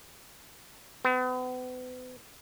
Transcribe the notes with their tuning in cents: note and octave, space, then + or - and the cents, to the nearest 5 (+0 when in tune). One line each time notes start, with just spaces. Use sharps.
B3 +40